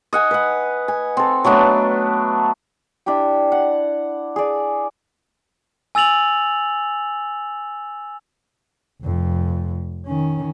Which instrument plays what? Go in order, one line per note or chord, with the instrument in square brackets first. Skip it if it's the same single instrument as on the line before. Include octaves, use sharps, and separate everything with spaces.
[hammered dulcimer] D#5 F#5 G#5
B4 F#5
G#5
C4 A4
F#3 A3 B3 D4
[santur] D4 E4 G4 G5
F#5
G#4 D5
[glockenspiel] G#5 E6 A6 F7 F#7
[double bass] F1 F2
D#3 C#4